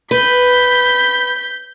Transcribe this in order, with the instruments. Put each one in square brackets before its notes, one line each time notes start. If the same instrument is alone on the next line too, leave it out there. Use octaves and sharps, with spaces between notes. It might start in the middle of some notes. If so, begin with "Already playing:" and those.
[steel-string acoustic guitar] B4 [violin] G6 B6